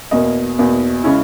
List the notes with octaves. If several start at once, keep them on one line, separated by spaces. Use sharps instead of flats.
E2 B2 A#3 D#5
E2 B2 A#3
C#3 G#3 C#4 E4